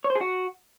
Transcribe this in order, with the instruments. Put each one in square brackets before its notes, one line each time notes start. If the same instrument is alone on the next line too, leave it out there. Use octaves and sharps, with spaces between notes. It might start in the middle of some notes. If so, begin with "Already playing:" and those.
[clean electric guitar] C#5
C5
G#4
F#4